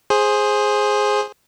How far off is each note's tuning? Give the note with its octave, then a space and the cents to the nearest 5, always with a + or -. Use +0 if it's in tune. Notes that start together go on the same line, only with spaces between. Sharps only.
G#4 +0 C5 +15